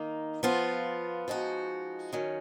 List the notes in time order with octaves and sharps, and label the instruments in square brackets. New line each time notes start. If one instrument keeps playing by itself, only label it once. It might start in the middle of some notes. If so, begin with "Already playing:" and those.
Already playing: [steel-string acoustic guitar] D#3 A#3 D#4
F3 B3 F4
F3 G#3 D#4 F#4
D#3 F#3 C#4